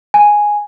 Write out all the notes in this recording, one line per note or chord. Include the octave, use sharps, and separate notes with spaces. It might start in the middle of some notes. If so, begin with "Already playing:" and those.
G#5